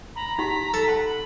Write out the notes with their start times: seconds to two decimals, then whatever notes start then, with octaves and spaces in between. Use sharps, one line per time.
0.16 A#5 B5
0.38 D#4 G4 C6 B6
0.74 A4
0.88 F#5 A5 C6
1.05 B5